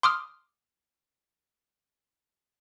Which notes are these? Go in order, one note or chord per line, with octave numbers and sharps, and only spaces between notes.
C6 D6 D#6 F6